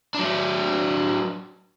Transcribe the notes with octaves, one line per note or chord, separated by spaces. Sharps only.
F#3 D4